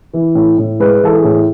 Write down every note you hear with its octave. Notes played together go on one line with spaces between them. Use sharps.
E3
A2
A2
G#3 B4
E3 A4
G#4
A2